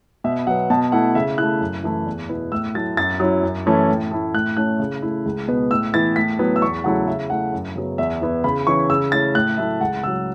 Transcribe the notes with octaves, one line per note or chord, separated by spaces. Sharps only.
B2 E5
F#3 B3 F#5
B2 A5
A3 E4 F#5
C#3 E5
A3 E4 F#6
F#2
E3 A3 E4
E2
B2 B3 E4
A2 E6
F#3 A3 E4 A6
F#2 A6
F#3 C#4 E4
F#2
E3 A3 C#4 E4
A2
A3 E4
A2 F#6
A3 C#4 E4 F#6
C#3
A3 E4
C#2
B2 B3
A2 E6
E3 B3 E4 A6
A2 B6
F#3 B3 E4
E6
E2 C#6
C#3 F#3 A3 E4 F#5
C#3 E5
A3 E4 F#5
F#2
C#3 F#3 B3
E2 E5
E3 B3 E4
C#3 B5
E3 C#4 E4 C#6
C#3 E6
A3 C#4 E4 A6
A2 F#6
F#3 A3 E4 E5
C#2 F#5
C#3 F#3 E6